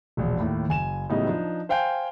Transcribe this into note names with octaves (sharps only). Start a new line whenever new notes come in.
E1 A#1
D#2 A2
F#1 G#5 E7
A2 C#3 F#3 G3 B3 D#4
F3 D4 D#4
C5 F5 G5 G#5 G6